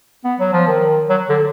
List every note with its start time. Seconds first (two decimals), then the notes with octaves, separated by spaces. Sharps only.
0.24 B3
0.39 F#3
0.53 F3
0.67 D#3
1.09 F#3
1.29 D3